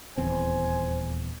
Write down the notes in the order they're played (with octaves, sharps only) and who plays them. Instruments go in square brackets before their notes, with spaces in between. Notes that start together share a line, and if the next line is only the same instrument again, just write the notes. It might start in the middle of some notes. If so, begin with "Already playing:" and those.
[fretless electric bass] D#1 E2 C4 [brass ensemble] C5 G#5